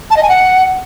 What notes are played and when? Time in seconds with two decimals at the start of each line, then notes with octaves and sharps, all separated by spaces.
0.10 A5
0.16 D#5
0.22 G#5
0.29 F#5